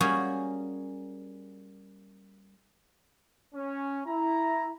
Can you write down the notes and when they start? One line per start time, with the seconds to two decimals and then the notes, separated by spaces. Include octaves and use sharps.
0.01 G3 A#3 C#4 F#4 G#4
3.55 C#4
4.06 E4 A#5